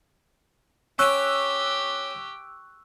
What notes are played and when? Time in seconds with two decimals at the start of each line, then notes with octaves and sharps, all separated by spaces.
0.99 C#4 G4 C#6 E6 F#6